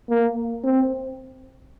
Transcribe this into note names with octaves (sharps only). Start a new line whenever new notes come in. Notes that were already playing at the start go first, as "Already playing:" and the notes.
A#3
C4